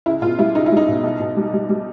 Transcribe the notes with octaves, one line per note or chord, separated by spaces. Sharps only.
C#2 E4
B2 F4
G3 E4
C#2 D#4
E4
G3 D#4
B2
B1
B2
G3
G3
G3